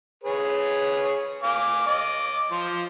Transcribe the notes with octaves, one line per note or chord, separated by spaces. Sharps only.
G#4 B4 C#5
F5 G#5 D6
D#5 D6
F3 C6